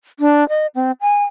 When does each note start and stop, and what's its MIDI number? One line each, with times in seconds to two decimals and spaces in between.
0.19 0.47 62
0.49 0.67 75
0.75 0.91 60
1.01 1.23 80